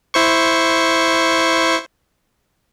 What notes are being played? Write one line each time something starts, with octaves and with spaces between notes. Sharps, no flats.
E4 C5 C#6